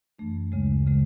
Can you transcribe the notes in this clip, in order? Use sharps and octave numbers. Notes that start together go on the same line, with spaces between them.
F#2 E3 A3 D4
D2 C#3 G#3
C#3 G#3